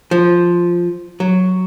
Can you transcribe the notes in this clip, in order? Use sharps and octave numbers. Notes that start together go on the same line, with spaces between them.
F3
F#3